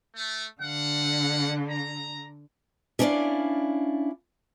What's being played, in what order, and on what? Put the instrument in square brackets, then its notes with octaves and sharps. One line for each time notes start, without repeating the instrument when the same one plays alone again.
[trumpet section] A3
[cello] D3 [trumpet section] F5 F#5
[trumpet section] A#5
[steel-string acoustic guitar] C#4 D4 E4 C#5 D5 F5